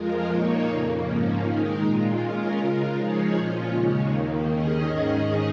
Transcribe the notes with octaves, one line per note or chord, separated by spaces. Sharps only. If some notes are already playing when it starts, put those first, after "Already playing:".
Already playing: F2 F3 G#3 F4 A#4
A#2 A#3 D#4 C#5
F2 C#3 A#3
G#2 F3 A#3 C#4
D#3 G#3 D#4 A#4
A#2 G#3 F4
G#3 C#4 F4 A#4
C#3 G#3 F4 A#4
F3 G#3 D#4 G#4 C#5
A#2 F3 C#4 F4
D#2 C#3 G#3 C#4
D#2 D#3 A#3
D#2 D#3 C#4 G#4 D#5
G#2 D#3 C#4 G#4 D#5